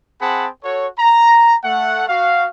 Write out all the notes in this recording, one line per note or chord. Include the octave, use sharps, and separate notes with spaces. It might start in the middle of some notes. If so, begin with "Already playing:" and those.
C4 G#4 F#5 A5 B5
F#4 A4 C#5
A#5
A3 F#5
F#4 F5